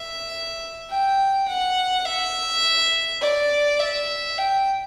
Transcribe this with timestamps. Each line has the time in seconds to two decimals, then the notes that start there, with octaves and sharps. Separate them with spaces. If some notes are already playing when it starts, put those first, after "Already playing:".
Already playing: E5
0.90 G5
1.48 F#5
2.05 E5
3.22 D5
3.80 E5
4.38 G5